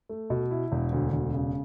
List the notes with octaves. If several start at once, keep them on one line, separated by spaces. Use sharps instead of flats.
A3
B2
E4
E1
D2
E1
C#3